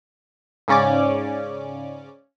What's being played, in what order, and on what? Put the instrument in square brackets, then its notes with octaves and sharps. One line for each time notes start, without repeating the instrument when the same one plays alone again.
[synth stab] G#2 C#3 C#4 D5 D6